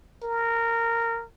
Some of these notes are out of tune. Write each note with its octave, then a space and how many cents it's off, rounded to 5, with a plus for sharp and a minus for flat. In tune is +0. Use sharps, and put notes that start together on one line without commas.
A#4 -15